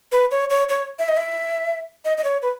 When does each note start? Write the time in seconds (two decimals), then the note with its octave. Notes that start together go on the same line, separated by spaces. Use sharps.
0.12 B4
0.31 C#5
0.50 C#5
0.69 C#5
0.99 E5
1.09 D#5
1.17 E5
2.05 D#5
2.18 D#5
2.24 C#5
2.42 B4